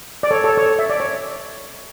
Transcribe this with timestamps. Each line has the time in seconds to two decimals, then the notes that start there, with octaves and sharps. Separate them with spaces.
0.23 D5
0.31 A4 C#5
0.44 A4 C#5
0.57 A4 C#5
0.79 E5
0.90 D5
1.00 C#5